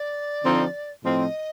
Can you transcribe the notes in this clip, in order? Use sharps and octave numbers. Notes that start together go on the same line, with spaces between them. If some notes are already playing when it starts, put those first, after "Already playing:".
Already playing: D5
D3 F3 C4 D#4
A2 F3 C4 D#5